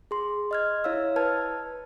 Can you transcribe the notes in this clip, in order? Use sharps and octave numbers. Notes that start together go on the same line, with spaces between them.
G#4 C6
D#5 F6 G#6
E4 C#5 F5 E6
B4 A5 F6 G#6